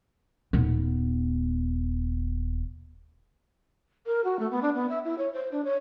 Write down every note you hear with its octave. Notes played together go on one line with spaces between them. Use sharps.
D#1 B3
A#4
F#4
A3
B3
D4
B3
E5
E4
C#5
C5
D4
C#5